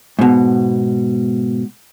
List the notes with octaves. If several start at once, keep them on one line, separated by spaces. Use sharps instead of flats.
G#2 B2